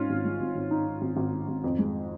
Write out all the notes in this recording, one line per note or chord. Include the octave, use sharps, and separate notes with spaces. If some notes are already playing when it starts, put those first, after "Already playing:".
Already playing: G#2 C#4 F4
G#1
G#3
G#1
G#1
G#2 D#4
G#2
G#1
G#1
G#2
G#1
F2
G#3